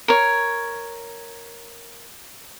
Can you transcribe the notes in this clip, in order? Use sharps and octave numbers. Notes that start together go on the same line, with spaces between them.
A#4 C#5